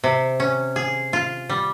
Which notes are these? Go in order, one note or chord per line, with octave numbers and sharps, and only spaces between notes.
C3
C#4
G#4
F4
G3